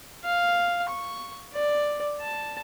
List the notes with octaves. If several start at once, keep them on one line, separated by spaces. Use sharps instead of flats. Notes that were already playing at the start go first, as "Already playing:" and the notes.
F5
C#6
D5
A5